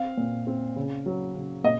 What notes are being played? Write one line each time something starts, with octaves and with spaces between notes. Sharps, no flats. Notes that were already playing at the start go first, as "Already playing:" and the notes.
Already playing: C4 F5
A#2
C4
C#3
F#3
C#3
A#2 D#5